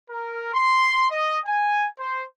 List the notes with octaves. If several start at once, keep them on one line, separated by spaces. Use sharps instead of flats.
A#4
C6
D#5
G#5
C5